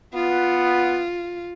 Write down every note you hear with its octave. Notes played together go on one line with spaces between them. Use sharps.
B3 F4